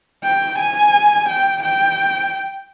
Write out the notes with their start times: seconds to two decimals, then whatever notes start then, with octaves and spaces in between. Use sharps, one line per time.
0.24 G5
0.58 G#5
1.28 G5
1.62 G5